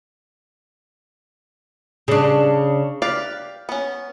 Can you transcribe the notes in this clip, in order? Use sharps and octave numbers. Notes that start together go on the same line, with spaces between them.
C#3 D4
G4 B4 D5 F5
B3 C#4